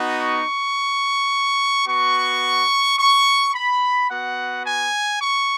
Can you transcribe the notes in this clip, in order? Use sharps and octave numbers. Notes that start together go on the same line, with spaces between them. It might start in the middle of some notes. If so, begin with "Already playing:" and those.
Already playing: B3 D#4 F#4
C#6
B3 F#4 C#6
C#6
B5
B3 F#4 F#5
G#5
C#6